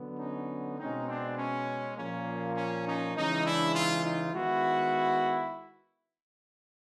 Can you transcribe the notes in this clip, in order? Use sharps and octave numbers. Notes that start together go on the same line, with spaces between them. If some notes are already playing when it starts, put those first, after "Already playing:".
Already playing: D3 F#3 B3
C#4 D#4
B2 G#3 C4 C#4 D#4
C4 D4
C#4
A#2 F3 A#3 C#4
C#4
C#4 D#4
C#3 E3 G#3 C#4 D#4
D4 E4
D#4 F4
D#4 F4
D#3 G#3 B3 E4 F#4